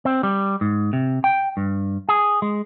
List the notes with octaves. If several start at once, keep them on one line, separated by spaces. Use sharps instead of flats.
C4
G3
G#2
C3
G5
G2
G#4
G#3